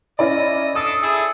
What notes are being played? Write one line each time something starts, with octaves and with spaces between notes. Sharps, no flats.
C#4 E4 D5 D#5
D4 A4 D#6
E4 G#4 A4